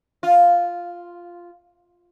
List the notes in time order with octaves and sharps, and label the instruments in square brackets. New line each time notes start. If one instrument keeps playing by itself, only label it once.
[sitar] F4